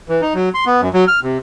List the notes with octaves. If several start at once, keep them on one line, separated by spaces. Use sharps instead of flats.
E3
D#4
F#3
C6
B3
F#2
F#3
F6
C3